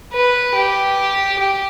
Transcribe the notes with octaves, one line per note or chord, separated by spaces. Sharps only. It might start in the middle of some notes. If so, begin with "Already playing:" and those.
B4
G4
G4